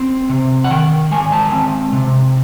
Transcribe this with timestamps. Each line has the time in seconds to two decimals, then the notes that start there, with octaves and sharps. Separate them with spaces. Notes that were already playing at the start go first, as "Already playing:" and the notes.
Already playing: C4
0.30 C3
0.64 F#5
0.70 D#3 G5
1.11 G#3 G#5
1.32 A5
1.52 C4
1.93 C3